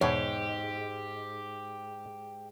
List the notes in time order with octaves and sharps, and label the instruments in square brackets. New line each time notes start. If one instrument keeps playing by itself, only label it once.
[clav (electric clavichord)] E2 B2 [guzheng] G#2 [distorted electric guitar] G4 [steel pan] C#5 G5